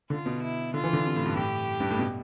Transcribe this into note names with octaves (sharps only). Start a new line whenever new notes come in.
D3 F4
B2
E4
D3 F4
E3
D3
C3
A2
G2
A2 G4
G2
A2
B2